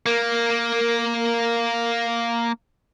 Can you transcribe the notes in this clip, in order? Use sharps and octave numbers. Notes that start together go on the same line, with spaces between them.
A#3 A#4